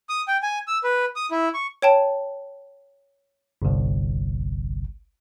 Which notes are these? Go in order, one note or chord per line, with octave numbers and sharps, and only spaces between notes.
D#6
G5
G#5
E6
B4
D#6
E4
C#6
C#5 G5 A5
G1 C2